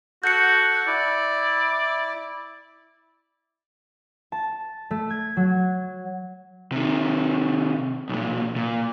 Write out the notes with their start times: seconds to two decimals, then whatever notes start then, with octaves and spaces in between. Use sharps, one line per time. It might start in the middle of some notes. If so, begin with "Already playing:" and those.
0.24 F#4 A4 F#5 G6 C#7
0.87 E4 D5
4.32 A5
4.91 A3
5.10 G#6
5.37 F#3
6.72 C3 D#3
8.09 B1 A#2
8.56 A#2